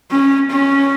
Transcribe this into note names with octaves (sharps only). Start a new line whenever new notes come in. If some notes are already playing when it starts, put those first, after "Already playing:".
C#4
C#4